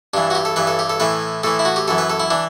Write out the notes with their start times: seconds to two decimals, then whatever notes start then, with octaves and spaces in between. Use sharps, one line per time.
0.14 G2 E3 D4
0.30 F#4
0.35 G4
0.45 A4
0.56 G2 E3 B4
0.67 A4
0.79 G4
0.90 A4
1.00 A2 E3 B4
1.44 A2 E3 A4
1.59 E4
1.65 F#4
1.76 G4
1.88 F#2 E3 A4
1.98 B4
2.10 A4
2.20 E4
2.31 E3 D4